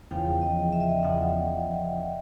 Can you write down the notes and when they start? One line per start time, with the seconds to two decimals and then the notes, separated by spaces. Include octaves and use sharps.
0.11 E2 C#3 F3 F5 G5
0.41 D#5 F5
0.73 E5
0.80 D#5
0.89 D5 E5
1.03 E2 C#3 F3 E5 F#5